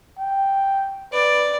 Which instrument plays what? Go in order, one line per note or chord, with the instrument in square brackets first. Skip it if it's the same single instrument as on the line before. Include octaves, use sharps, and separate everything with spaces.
[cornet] G5
[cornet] B4 [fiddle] D5